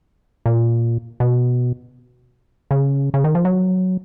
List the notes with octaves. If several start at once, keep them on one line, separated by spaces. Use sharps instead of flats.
A#2
B2
C#3
C#3
D#3
F3
F#3